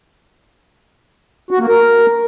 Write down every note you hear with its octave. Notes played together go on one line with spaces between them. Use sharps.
F#4
A#3
A#4